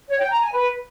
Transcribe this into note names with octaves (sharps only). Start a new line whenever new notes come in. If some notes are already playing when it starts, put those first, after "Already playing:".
C#5
G5
A#5
G#5
B4